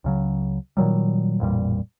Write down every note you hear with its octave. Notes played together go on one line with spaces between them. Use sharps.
C#2 C#3 F#3
A#2 D#3 F#3 G3
A1 F2 A#2 G3